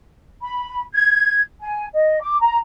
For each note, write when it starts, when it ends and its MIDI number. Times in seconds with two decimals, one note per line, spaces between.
0.41 0.81 83
0.93 1.39 92
1.60 1.85 80
1.93 2.17 75
2.20 2.38 86
2.40 2.56 82